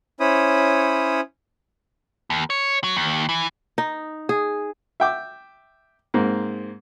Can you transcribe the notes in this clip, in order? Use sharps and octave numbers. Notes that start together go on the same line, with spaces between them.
C#4 E4 C5 C#5 B5 D#6
D#2
C#5
F#3
D#2
E3
D#4
G#4
E5 G5 D6
G#2 A#3 C4